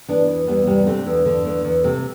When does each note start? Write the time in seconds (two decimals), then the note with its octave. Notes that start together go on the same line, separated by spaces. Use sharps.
0.08 E3 B3 D4
0.28 E2
0.47 E2 G3 B3
0.67 C3 G3 B3
0.86 D3 A3 C4
1.06 E2 A3
1.26 D3
1.45 E2 A3
1.64 E2
1.84 C3 A3